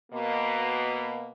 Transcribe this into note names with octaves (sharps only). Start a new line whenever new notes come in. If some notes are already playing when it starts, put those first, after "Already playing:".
B2 A#3